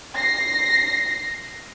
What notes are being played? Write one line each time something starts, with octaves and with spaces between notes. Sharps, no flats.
A#6 C7